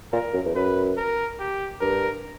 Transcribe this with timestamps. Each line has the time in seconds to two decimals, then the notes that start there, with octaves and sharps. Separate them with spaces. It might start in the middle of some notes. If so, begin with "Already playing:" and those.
0.12 A#2 A#4
0.33 F#2
0.45 E2
0.55 F#2 B4
0.97 A#4
1.39 G4
1.81 G2 A#4